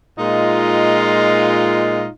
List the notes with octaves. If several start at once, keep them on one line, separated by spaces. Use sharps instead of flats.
A#2 G#3 D#4 F4